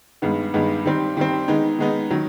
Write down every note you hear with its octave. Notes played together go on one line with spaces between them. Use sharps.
G2 D#3 G#3 B3
G2 D#3 G#3 B3
D#3 G3 C4
D#3 G3 C4
D#3 G#3 B3 D#4
D#3 G#3 B3 D#4
D#3 F#3